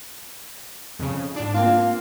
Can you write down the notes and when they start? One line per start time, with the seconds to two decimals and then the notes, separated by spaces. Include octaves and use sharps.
0.99 F2 C#3
1.36 G#2 D4
1.54 A#3 C4 F4 F5